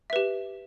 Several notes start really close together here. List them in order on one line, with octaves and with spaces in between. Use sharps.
E5 B4 G4